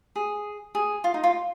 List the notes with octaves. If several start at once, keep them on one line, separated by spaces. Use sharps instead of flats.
G#4
G#4
F4
D#4
F4